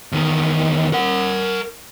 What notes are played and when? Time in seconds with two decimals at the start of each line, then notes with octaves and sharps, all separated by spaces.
0.12 E2 D#3
0.93 A#4 F#5